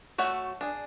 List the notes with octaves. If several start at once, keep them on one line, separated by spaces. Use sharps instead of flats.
A3 F#4 C#5 E5 F#5
D4 G#4